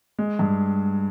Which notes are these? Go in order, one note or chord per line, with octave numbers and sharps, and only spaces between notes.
G#3
G2